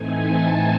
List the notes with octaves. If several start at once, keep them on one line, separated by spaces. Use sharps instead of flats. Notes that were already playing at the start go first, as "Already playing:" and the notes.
Already playing: A2 E3 A3 C4 D#4 G#5
A5